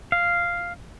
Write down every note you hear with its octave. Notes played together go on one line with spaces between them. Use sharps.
F5